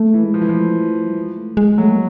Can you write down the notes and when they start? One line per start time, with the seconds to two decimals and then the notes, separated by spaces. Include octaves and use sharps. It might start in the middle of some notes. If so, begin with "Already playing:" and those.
Already playing: A3
0.14 E3
0.24 G#3
0.34 F3
0.41 E3
0.49 F3
0.54 A3
1.07 G3
1.16 G#3
1.37 A3
1.57 G#3
1.78 F#3 A3
1.92 A#3